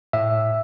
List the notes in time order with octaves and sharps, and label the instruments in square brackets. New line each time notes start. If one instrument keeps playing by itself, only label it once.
[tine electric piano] A2 E5